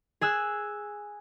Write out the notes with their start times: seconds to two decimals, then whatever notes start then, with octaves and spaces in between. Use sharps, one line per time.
0.21 G#4 G#5 E6 F#6